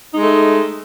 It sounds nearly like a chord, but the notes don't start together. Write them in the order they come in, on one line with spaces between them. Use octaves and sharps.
D#4 G#3 A3